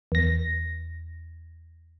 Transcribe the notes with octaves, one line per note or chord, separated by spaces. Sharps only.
E2 A#6